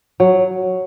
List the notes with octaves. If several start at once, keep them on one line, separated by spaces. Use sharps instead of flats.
F#3